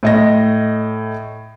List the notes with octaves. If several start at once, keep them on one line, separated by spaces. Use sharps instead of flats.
A2 D#5 A#6